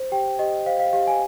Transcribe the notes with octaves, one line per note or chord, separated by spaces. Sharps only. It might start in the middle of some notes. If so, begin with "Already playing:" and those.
Already playing: C5
G4 G5
G4 D#5
C5 F5
F5
G4 F5
G#5